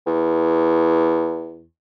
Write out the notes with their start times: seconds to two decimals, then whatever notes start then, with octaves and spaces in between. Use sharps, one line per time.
0.07 E2